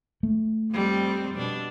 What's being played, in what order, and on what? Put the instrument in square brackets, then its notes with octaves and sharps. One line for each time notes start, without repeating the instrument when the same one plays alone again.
[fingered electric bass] A3
[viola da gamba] F2 G3 C4
B2 D4